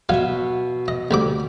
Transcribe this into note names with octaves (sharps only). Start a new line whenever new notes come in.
B2 F#3 F#4 E5 F5
D#5
D2 G3 D6